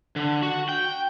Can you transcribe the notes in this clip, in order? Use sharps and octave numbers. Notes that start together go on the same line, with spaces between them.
D3
F#4
G5